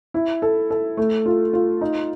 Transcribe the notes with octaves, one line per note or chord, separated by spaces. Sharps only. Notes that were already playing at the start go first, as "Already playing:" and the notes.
E4
A4
A4
A3
F4
F4
D#4